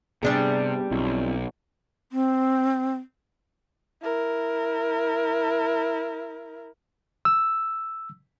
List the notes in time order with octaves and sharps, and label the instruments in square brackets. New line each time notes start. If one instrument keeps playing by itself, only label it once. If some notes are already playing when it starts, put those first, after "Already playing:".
[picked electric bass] C3 [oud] G3 D4 G#4 [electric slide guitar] B3 G4
[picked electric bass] B1 [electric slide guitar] C4 E4 F4
[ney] C4
[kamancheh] E4 A#4
[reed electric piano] E6